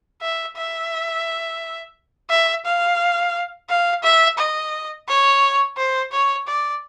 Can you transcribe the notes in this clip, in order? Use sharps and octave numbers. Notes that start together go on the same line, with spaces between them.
E5
E5
E5
F5
F5
E5
D#5
C#5
C5
C#5
D5